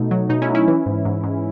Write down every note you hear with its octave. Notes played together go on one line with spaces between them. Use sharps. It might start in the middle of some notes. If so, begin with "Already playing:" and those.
Already playing: B2 A3 D#4
F#3
B2 D#4
C#4 E4
F#3
C#4 E4
E3
G#2
G#2
G#2